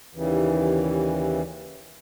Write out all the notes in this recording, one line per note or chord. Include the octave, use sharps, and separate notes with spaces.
D#2 C#3 E3 G3